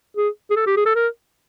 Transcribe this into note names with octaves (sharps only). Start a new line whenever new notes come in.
G#4
G#4
A4
G4
G#4
A4
A#4